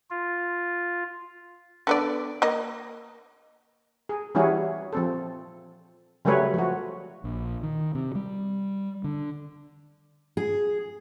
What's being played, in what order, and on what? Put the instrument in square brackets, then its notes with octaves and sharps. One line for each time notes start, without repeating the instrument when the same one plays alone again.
[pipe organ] F4
[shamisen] D3 B3 D5
A#3 D#5
[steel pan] G#4
E3 G3 C#4 E4 F#4 G#4
F3 C4 A4
C#3 F#3 G3 A3 B4 C#5
F3 F#4
[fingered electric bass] A#1
D#3
C3
G3
D3
[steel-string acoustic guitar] G#4